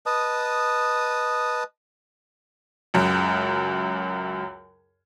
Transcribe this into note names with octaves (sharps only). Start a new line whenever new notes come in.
B4 D#5 A5 D#6
C#2 F#2